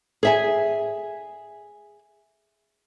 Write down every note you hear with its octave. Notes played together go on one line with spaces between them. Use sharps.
G#4 E5 G#5